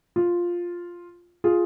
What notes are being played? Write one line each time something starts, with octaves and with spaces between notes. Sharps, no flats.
F4
F4 G#4